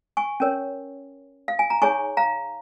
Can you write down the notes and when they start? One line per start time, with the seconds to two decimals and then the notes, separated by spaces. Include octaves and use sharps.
0.17 G#5 C#6
0.40 C#4 A#4 C#5
1.48 F5
1.59 G#5
1.70 A#5
1.82 D#4 G#4 C#5 G#5 C#6
2.17 F5 A#5